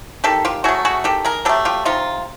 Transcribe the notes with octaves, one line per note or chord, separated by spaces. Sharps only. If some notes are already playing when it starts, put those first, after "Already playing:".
D#3 G4 A4
F4 G4
F#3 A3 F#4 G#4
F#4 G#4
D#3 G4 A4
G#4 A#4
F#3 A3 G4 A4
F4 G4
C3 D#4 F4